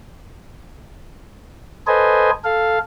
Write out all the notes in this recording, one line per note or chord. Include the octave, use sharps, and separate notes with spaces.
A4 B4 C5 D#5 G#5
A4 F5